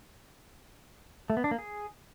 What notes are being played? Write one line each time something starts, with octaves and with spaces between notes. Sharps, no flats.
A3
B3
D4
A#3
G#4